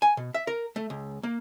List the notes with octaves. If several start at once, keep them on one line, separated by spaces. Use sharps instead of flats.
G#5
B2
E5
A#4
A3
C#2
A#3